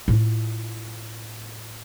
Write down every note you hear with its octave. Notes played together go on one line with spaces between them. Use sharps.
A2 F4